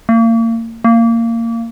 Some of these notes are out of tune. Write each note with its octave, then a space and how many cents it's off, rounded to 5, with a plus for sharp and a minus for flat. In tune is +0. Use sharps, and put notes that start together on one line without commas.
A#3 -35
A#3 -20